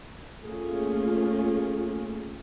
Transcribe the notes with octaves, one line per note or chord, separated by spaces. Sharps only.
A3 A#3 C#4 F4 G#4